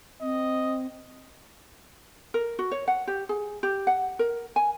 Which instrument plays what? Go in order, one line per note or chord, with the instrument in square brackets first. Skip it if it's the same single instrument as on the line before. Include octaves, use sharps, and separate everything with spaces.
[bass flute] C4 [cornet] D#5
[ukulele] A#4
F#4
C#5
F#5
G4
G#4
G4
F#5
A#4
G#5